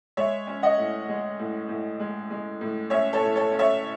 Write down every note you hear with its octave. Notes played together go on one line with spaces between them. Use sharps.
G#3 C#5 E5
C#4
D#5 F#5
A2
G#3
A2
A2
G#3
G#3
A2
C#4 C#5 E5
A4 C#5
A2
A4 C#5
C#4
C#5 E5